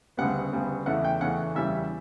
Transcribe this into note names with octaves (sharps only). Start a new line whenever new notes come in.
D2 C#3 G3 B3 F#5
D2 C#3 G3 B3
E2 C#3 E3 A3 C#4 F#5
G5
E2 C#3 E3 A3 C#4 F#5
E2 C#3 E3 G3 C#4 E5